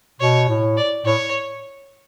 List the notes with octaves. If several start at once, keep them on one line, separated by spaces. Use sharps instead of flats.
B2 C#5
A2
D5
A2 C#5